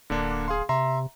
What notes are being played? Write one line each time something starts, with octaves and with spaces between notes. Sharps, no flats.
D1 D3 A#3 D4
G#4 F5 C6
C3 E5 A#5 C6